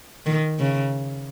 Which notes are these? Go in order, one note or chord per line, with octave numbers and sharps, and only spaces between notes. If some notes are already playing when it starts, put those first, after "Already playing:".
D#3
C#3